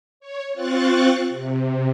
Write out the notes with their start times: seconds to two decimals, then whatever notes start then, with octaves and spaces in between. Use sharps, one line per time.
0.20 C#5
0.54 C4 F4 C#6 F#6 A6
1.30 C3